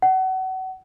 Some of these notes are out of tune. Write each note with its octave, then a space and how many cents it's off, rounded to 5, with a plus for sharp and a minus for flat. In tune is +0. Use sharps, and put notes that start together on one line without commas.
F#5 +30